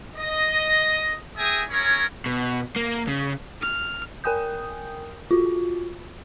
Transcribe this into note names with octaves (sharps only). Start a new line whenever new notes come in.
D#5
G#4 E5 G5 G#5 A#5 D#6
C#4 E4 G#4 A#4 C#5
B2
A#3
C#3
F6
A#4 G5 G#5 D#6 G6
F4 F#4